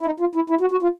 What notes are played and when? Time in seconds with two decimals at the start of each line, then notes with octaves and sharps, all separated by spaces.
0.01 E4
0.06 D#4
0.20 F4
0.35 E4
0.50 E4
0.61 F#4
0.71 F#4
0.82 F4